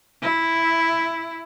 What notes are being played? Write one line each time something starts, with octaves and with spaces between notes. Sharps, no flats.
E4